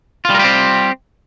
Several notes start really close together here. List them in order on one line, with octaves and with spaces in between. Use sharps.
F4 G3 A#4 G4 C4